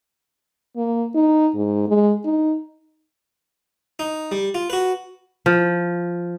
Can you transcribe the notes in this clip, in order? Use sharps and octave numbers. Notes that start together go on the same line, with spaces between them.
A#3
D#4
G#2
G#3
D#4
D#4
G3
F4
F#4 B4
F3